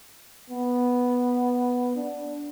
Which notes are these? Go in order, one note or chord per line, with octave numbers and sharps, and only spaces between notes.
B3
D4